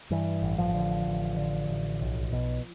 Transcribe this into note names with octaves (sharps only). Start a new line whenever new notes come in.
G2 E3
A1
F3
D3
A1
D3
A1
B1
B2